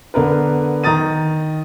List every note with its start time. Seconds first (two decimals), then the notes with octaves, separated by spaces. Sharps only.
0.14 D3 B3 A#4 B4
0.84 D#3 A#5 D#6 A6 D#7